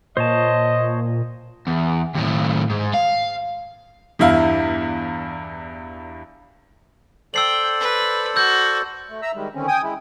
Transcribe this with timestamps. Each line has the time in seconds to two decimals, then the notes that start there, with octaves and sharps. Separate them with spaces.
0.17 A#2 C5 C#5 D#5 A5
1.67 E2
2.14 D#2 A2
2.70 G#2
2.94 F5
4.19 E2 G2 E4 F5
7.34 A4 C5 D5 G5 E6 C7 F#7
7.80 B4
8.36 F#4 E6 G6
9.10 A3
9.22 E5 A#5 E6
9.35 D#3 G3 G#3
9.55 D3 D#3 C4 C#4
9.68 G5 G#5 D#6
9.83 G#3 E4